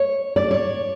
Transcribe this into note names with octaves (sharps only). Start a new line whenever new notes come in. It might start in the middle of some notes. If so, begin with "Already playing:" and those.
Already playing: C#5
D5
C#5